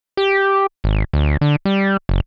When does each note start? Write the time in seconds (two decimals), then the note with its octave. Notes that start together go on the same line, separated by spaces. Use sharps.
0.17 G4
0.84 G#1
1.13 D2
1.41 D3
1.65 G3
2.09 F#1